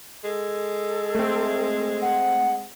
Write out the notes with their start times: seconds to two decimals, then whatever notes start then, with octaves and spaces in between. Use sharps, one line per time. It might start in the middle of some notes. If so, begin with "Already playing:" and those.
0.24 G#3 A4
1.15 A3 C4
2.02 F#5